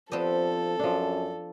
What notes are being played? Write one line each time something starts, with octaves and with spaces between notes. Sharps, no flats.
F3 B3 C4 D4 G4 A4 D#5
F#2 F3 D4